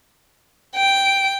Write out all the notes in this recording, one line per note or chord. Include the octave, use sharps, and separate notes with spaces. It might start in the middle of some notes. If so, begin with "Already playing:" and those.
G5 D7